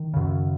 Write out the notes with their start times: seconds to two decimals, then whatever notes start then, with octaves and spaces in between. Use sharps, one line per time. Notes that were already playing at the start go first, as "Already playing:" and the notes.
Already playing: D#3
0.14 F#2 C#3